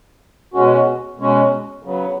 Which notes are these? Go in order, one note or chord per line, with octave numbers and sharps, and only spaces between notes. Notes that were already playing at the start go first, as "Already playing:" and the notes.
B2 G#3 C#4 F#4
B2 G#3 C#4 F#4
C#3 F#3 B3